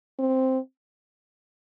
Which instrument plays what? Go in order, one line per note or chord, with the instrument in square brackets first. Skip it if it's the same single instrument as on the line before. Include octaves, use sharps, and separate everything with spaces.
[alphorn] C4